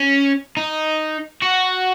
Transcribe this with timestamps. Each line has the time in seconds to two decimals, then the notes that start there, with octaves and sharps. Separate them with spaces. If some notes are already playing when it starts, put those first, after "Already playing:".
Already playing: C#4
0.57 D#4
1.43 F#4